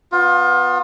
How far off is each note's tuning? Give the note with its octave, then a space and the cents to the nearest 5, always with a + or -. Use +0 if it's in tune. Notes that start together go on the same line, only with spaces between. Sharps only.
B3 +0 F4 +30